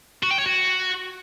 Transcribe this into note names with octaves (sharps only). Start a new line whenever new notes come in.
F#4
G5
C#5
F#4